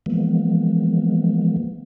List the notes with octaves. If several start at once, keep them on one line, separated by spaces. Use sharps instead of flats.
E3 F3 G#3 A#3 B3